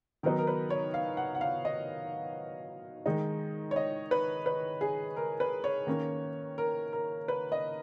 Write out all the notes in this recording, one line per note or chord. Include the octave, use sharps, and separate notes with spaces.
D#3 F#3 B3 D#4 A#4
A#4
B4
C#5
F5
F#5
F#5
F5
D#5
D#3 G#3 D#4
C#5
D#5
B4
B4
G#4
A#4
B4
C#5
D#3 A#3 C#4
A#4
A#4
B4
D#5